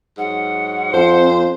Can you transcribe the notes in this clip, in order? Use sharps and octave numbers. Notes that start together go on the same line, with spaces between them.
G#2 F#3 F#5
F2 C4 C5